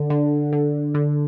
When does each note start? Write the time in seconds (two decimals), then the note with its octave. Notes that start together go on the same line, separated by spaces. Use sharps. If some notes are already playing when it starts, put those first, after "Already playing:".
Already playing: D3
0.10 D3
0.53 D3
0.94 D3